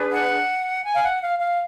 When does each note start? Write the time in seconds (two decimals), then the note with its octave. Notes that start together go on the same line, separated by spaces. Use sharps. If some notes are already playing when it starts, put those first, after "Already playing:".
Already playing: D4 G#4 B4
0.09 F#5
0.84 G#5
0.93 F5
1.02 F#5
1.20 F5
1.38 F5